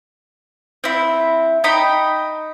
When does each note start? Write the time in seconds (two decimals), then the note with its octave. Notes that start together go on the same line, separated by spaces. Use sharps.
0.84 C4 E4
1.64 D#4 G5 A#5 B5